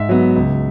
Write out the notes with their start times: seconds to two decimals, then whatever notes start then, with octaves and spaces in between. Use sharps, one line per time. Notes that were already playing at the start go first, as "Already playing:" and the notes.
Already playing: G#2 E5
0.09 F#3 B3
0.36 C#2